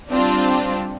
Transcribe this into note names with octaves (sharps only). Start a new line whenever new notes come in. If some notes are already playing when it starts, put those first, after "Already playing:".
G3 C4 D4 F4